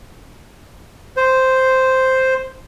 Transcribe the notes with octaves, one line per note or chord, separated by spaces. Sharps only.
C5